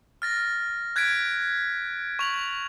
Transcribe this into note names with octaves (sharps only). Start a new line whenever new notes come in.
F6 A6 A#6
F#6 G#6 A6 B6 D7
C#6 F7 F#7